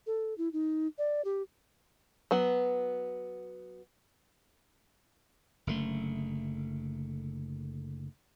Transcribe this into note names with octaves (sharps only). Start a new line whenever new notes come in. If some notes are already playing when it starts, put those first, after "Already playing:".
A4
E4
D#4
D5
G4
F#3 B3
F#1 D3 A3